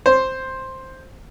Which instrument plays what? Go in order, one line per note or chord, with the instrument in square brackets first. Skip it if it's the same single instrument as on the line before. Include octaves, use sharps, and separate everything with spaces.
[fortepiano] C5